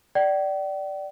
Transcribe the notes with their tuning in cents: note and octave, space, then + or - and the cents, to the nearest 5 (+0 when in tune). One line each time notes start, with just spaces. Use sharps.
D5 +0 G5 -45